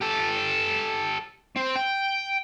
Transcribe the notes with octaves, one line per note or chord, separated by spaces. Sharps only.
G4 A4
C4
G5